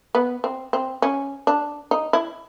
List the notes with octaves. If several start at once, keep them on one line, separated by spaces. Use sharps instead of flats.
B3
C4
C4
C#4
D4
D#4
E4